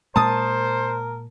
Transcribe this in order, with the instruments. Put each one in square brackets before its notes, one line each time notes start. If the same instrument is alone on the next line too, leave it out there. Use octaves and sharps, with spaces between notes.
[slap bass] A#2 G#3 [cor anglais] A#4 [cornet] C5 [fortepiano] A5 D#6